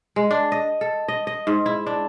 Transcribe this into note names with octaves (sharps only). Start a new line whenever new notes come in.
G#3
D4
D#5
A4
D#5
D#5
G#2
E4
D4